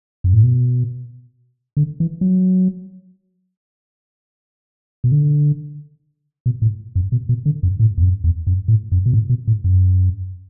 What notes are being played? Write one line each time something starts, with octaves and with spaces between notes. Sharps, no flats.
F#2
A2
B2
D3
E3
F#3
B2
D3
B2
A2
F#2
B2
B2
D3
F#2
A2
E2
F#2
E2
F#2
A2
F#2
B2
A2
B2
A2
F#2